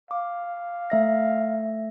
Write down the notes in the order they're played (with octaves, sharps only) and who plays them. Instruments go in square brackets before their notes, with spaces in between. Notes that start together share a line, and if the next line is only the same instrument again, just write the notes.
[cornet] F5 [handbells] D6
[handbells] A3 E5 A#6